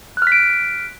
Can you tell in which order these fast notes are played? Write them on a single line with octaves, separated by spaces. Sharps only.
F#6 F6 B6 D7